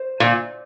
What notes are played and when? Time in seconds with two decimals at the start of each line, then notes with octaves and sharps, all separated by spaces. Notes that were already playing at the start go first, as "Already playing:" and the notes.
Already playing: C5
0.20 A#2